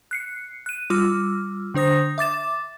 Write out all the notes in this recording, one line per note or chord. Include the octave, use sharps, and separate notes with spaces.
F#6 C7 C#7
F#6 D#7
G3 F4 D6 E6 F6
D3 D4 C5 D#6 A#6
E5 D6 A6 E7